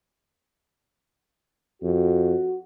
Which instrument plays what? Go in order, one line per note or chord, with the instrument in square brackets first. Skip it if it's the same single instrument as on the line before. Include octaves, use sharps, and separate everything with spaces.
[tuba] F2 [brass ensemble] F#4